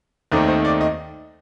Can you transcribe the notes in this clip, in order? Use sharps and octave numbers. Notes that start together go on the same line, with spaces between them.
D#2 D#3 A3 C4 D#4 D5
C5
D5
D#5